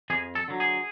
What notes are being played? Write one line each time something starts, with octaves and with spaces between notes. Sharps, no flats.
F2 G#4
A4
D3 F#3
G#4